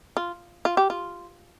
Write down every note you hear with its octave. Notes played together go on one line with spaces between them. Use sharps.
F4
F4
G4
F4